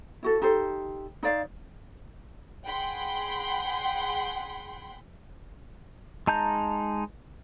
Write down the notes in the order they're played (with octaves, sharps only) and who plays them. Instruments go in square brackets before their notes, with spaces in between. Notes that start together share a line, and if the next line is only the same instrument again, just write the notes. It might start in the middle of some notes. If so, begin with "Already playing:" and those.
[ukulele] E4 F#4 A4
D#4 G4 A4 C5
D#4 C5 D5 F5
[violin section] G#4 F#5 G5 B5 C6
[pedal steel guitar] G#3 D#4 A5 A#5 G6